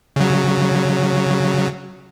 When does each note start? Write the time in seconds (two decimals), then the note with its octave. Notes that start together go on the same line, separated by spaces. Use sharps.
0.16 C#3 F#3